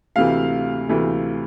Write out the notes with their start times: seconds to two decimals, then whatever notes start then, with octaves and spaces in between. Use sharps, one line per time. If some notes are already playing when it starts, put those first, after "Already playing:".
0.16 D2 C3 E3 A3 F5
0.89 D2 C3 E3 A3